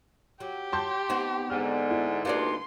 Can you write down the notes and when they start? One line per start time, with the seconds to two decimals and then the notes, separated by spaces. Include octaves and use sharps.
0.40 F#3 G4
0.72 A5 C6 G6
1.09 B3 C4 D#4
1.50 G#2 D3 F6
1.90 E4
2.25 D2 G2 A#3 D#4 C5 D5 C6